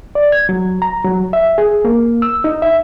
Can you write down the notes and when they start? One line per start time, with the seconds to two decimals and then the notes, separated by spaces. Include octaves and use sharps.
0.15 D5
0.32 G#6
0.49 F#3
0.82 A#5
1.05 F#3
1.33 E5
1.58 G#4
1.85 A#3
2.22 E6
2.44 D#4
2.62 E5